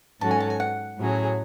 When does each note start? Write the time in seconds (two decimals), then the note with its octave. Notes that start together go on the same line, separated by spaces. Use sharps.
0.21 G#2 F#3 C#4 F#4 A4 A5
0.31 G#5
0.40 A5
0.50 G#5
0.60 F#5
0.98 A2 F#3 C#4 G#4